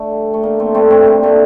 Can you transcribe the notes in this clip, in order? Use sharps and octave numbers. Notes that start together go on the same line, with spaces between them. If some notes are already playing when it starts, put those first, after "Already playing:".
Already playing: D3 A3
G3
A3
D3 A#3
A3 C4
G3 A3 C4
A3 C4
D3 A#3
A3